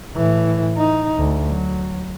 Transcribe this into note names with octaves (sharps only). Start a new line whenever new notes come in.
A2 E3
D#4
D2
F#3